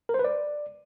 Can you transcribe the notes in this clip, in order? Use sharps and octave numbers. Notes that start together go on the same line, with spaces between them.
A#4
C5
B4
D5